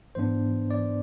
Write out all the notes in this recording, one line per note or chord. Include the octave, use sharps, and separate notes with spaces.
G#2 E3 B3 D4 C5
D5